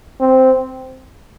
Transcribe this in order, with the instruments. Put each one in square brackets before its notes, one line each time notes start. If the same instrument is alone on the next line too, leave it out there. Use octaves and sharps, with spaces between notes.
[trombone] C4